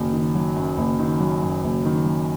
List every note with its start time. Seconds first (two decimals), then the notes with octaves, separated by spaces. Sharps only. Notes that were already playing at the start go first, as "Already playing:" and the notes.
Already playing: F#1 F#2 D#3 F#3
0.13 D#3
0.35 F#3
0.56 F#2
0.78 F#1
0.99 D#3
1.21 F#3
1.42 F#2
1.64 F#1
1.85 D#3
2.06 F#3